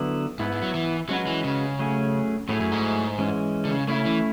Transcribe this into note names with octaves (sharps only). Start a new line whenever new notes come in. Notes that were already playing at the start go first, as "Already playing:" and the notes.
Already playing: D3 F#3 B3 E4 B4
G#2 B3 E4 B4
G#2
F#3
E3
F#3 G#3 C#4 F#4 B4
E3
C#3
F#3 A3 C#4 G#4
A2 F#3 A3 E4 G#4 C#5
F#2
G#2
E3 G#3 C#4
D3
C#3
C#3 A3 C#4 E4
E3